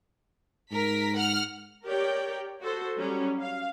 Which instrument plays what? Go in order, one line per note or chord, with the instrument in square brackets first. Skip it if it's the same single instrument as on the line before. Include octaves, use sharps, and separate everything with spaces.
[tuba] G#2 [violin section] A#4 B6
[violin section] F#5 F6
[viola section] G4 A#4 C#5 D5 G5
F#4 A4 C5
F#3 G3 C#4
F5